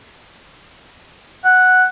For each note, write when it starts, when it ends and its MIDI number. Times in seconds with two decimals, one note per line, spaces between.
1.45 1.85 78